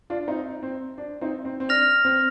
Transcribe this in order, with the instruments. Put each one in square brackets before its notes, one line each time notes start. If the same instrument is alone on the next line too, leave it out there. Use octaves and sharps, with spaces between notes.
[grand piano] D4 F4
C4 D#4
C4
D4
C4 D#4
C4
C4
[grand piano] D4 [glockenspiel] F6 A#6 F7
[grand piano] C4